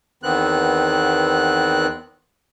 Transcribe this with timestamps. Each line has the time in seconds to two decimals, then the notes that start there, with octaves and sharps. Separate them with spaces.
0.23 E2 D#3 B3 C4 F#6